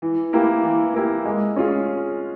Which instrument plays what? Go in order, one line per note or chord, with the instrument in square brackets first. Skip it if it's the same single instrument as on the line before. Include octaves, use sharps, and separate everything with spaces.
[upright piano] E3
A#3 E4 G4
E3
A#3 E4 G4
G#3
C#4 F4 G#4